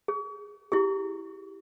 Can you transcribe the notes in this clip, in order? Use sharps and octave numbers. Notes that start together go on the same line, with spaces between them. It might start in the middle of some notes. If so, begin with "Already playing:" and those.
G#4
E4 G4 G#4